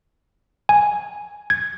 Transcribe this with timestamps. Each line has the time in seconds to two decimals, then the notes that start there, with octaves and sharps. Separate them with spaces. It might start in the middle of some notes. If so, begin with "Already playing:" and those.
0.69 G#5
1.50 G#6